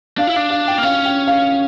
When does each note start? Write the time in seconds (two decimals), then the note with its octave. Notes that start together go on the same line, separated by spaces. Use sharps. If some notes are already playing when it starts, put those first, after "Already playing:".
0.18 D4 F5
0.27 E4
0.34 D4 F5
0.50 F5
0.68 G5
0.78 A#3
0.83 C#4 F5
1.05 G5
1.27 F5